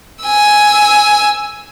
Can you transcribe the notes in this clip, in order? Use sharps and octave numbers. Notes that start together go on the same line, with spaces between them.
G#5 E6